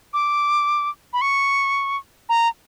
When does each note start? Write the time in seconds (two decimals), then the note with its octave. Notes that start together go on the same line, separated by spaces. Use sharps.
0.14 D6
1.13 B5
1.21 C#6
2.29 A#5